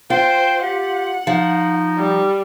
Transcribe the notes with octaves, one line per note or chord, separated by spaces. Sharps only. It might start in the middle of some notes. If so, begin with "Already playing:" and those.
F4 C5 G5
G4 F#5
F3 D#4
G3